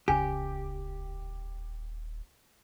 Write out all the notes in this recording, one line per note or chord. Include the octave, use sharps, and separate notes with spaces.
D#1 C#2 C#3 G4 G#5